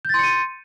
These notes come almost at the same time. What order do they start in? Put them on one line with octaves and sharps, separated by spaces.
G6 A6 C6 C#7 D#7